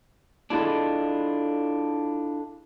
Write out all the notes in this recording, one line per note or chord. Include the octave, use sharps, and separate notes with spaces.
D4 E4 F4 G#4 A4 D#5